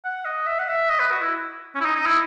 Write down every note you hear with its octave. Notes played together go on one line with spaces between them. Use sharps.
F#5
D#5
E5
F#5
E5
D#5
B4
F#4
E4
C#4
E4
D#4
D#4
E4